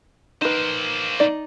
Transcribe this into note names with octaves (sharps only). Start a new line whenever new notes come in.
A#3 D#4 B4 C5
D#4 D5